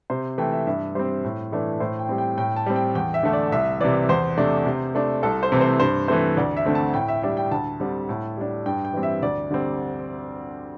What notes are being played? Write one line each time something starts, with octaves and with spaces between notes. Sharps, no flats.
C3 C5
E3 A3 G5
E5
G2 E5
G3 C4 C5
A2
E3 A3 D4
A2 C5
G5
G3 C4
G5
A2 G5
A5
G3 C4
G5
E2 G5
E5
D3 A3
D5
C2 E5
C3 E3 D5
E2 C5
C3 A3 D4
C3
A3 D4
C2 A4
C5
C3 E3 A3 C4
C5
G2 C5
E3 A3 C4 C5
D2 D5
E5
D3 A3 C4
A5
A2 G5
E5
G3 D4 E5
G5
D2 A5
D3 G3 C4
A2
G3 D4
G2 G5
G5
E3 G3 C4
E5
D2 D5
D3 G3 C4